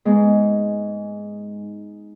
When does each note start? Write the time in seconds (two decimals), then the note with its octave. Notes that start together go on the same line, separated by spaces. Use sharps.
0.05 G#2 G#3 B3